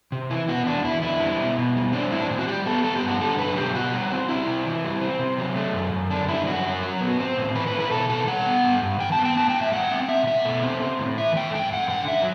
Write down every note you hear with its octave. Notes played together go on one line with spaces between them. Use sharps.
C3
E3 E4
B3 F#4
E2 D4
E2 E4
D3 E4
G3
B2
B2
G3
C4 D4
A2 E4
D4
A2
F#4
G3 G4
B3 A4
B3 A4
G4
G2
F#4
D3 A4
F#3 B4
B2 G4
B2 F#4
G3
C4
C4 E4
C3
E3
G3
C4
C3
F#3
A3
F#2
F#2
D3 D4
G3 E4
F#2 F#4
F#2
F#3
B3
C4
A2
E3 B4
B4
A3
B4
B2 A4
B2 A4
G3 F#5
B3
G2
G2
E3 G5
A5
B3
G5
A2 A5
G5
A2
E5
G3 F#5
C4
B2 E5
B2 E5
A3
C4
C4
A2
E3 E5
A3 G5
G2 G5
G2 F#5
D3 F#5
F#3 E5